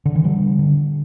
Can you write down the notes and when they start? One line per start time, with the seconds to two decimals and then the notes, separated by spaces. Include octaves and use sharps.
0.05 D3
0.15 E3
0.24 D3 G3
0.59 D3